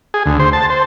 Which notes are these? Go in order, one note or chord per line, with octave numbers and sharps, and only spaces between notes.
G#4
D2
C5
A5
C5